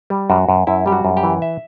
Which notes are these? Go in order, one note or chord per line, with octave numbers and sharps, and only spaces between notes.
G3
F#2 F#4
F#2
F#2 E4
G3 G4
F#4
F#2
G4
E3
E5